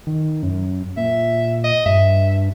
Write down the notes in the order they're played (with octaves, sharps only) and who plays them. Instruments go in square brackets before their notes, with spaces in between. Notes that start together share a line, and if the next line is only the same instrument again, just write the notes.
[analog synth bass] D#3
F#2
[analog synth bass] A#2 [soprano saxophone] E5
[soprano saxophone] D#5
[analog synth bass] G2 [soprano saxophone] E5